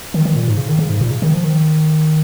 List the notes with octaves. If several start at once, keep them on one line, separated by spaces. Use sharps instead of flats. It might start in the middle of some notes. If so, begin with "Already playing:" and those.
D#3
D#3
A#2
G#2
C#3
D#3
C#3
G#2
A#2
C#3
D#3
F3
D#3